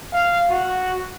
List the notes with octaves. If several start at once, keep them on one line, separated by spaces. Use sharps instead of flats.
F5
F#4